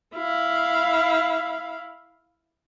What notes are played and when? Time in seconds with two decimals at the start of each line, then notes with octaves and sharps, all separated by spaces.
0.16 E4 F5